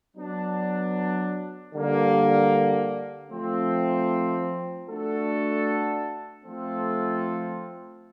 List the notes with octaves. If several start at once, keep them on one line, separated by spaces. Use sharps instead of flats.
F#3 B3 D4
D3 G3 A#3
F3 A3 C4
A3 D4 F#4 A4
F3 A3 C4 F4 A4